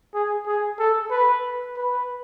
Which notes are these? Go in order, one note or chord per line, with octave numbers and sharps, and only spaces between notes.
G#4
G#4
A4
B4
B4